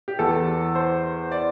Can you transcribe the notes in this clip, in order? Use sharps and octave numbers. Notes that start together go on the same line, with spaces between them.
G4
E2 E3 A4
C5
D5